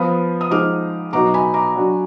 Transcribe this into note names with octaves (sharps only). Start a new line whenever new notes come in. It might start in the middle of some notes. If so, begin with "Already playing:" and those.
Already playing: F3 B3 F4 B5 D#6
D#6
F3 G#3 D#4 D6 F6
B2 F#3 B3 D#4 F#4 A#5 D6
G#5 B5
A#5 D6
F#3 D4 F#4